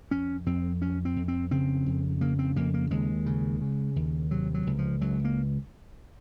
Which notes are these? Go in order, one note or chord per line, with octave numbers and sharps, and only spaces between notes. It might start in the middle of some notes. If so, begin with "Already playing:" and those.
F2 C#4
F2 C4
F2 C#4
C4
F2
C4
C#3 C4
F2
C#3 A#3
C4
F2 A#3
A#3
D#2 G#3
C#3
C#3
D#2
C3 F#3
F#3
C#2
F3
C#2 F#3
A#3